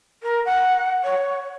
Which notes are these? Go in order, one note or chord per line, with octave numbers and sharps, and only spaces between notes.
A#4
F#5
C#5